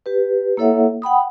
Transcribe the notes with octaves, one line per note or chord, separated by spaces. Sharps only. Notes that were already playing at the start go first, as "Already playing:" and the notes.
G4 B4
A#3 E4 A4 C#5 E5 F#5
F#5 G5 B5 D#6